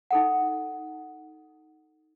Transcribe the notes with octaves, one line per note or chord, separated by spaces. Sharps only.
D#4 A4 F#5